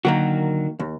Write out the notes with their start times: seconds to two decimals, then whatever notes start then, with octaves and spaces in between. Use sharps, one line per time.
0.05 D3 D#3 F#3 A#3 F#4
0.79 D#2